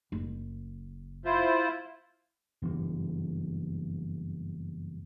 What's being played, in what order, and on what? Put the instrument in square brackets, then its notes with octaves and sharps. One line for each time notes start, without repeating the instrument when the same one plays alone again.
[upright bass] F#1
[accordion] E4 F4 C5
[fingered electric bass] F#1 E2 G2